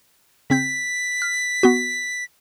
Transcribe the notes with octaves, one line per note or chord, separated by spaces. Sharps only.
C#3 C4 G6 B6
F6
B3 F#4